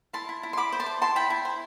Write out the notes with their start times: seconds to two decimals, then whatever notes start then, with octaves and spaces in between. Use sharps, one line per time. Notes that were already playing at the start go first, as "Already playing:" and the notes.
0.13 E4 A5 C6
0.29 E4
0.43 E4
0.53 C6
0.57 E4 B5 D6
0.72 C5
0.80 A5 C6
0.86 C5
1.02 E4 A5 C6
1.15 E4 G5 B5
1.30 E4
1.45 C5